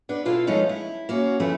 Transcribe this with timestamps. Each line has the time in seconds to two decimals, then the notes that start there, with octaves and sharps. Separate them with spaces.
0.09 B3 D4 B4
0.25 B2 E4 F4 A4 F5
0.47 F3 G#3 A3 C#4 D#4
0.69 E4
1.09 A#3 C#4 F#4
1.40 F#2 C#3 E3 F3 A3 B3